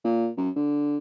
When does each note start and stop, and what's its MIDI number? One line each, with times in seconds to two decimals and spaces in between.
0.04 0.28 46
0.37 0.49 42
0.56 0.97 50